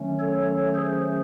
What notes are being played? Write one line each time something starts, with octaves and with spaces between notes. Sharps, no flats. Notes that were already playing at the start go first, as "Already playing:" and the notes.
Already playing: D#3 F#3 A3 C#4
A4 C#5
G#4 C5